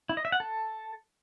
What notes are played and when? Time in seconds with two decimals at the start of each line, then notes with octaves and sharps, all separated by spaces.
0.09 E4
0.17 D#5
0.25 E5
0.32 F#5
0.40 A4